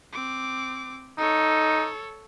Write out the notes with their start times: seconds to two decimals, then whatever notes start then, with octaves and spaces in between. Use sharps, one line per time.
0.13 C4 D6
1.18 D#4 A4 C#5